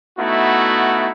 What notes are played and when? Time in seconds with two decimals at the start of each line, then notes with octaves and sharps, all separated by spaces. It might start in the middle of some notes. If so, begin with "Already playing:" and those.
0.18 A3 B3 D#4 E4 F#4